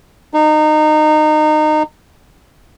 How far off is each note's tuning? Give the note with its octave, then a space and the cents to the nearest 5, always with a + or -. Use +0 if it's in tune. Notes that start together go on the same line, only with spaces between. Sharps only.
D#4 -25